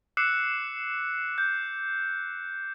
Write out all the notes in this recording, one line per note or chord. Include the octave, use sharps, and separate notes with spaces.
D6 E6 F#6 C7 C#7 E7
G6